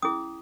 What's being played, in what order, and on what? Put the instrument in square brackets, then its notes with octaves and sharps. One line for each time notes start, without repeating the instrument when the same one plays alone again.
[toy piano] C#4 E4 G#4 D#6